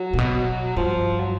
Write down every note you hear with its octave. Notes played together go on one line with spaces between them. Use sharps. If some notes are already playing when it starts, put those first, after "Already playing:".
Already playing: F#3
A#2
B2
G2 F3
F#3